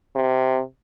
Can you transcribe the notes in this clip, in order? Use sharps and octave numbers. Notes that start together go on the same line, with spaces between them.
C3